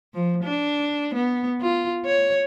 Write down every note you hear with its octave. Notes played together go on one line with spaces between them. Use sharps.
F3
D4
B3
F4
C#5